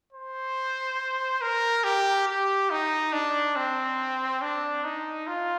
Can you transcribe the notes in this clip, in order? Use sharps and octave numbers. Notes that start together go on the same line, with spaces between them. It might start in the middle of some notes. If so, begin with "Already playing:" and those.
C5
A#4
G4
G4
D#4
D4
C4
D4
D#4
F4